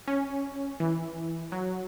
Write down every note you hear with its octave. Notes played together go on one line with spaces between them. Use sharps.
C#4
E3
F#3